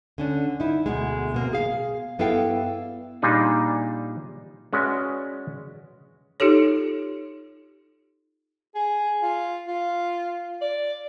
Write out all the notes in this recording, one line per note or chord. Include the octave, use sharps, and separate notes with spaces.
D3 C#4 D4
D#4 E4
D2 B2 G#3
B2 A#3 C4
G#4 F5
G2 B3 E4 A4 F5 G5
A#2 G3 D4 D#4 G#4
G#3 C#4 F#4 B4 D5 E5
D#4 F4 G4 A4 C#5
G#4
F4
F4
D5